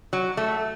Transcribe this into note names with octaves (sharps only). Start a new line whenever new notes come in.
F#3
A3